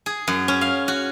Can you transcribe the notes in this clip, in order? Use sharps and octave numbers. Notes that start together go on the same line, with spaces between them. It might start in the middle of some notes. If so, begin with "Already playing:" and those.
G#4
F#2
C#4
F5
F#4